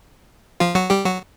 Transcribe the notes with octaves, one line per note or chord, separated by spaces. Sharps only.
F3 F4
F#3 F#4
G3 G4
F#3 F#4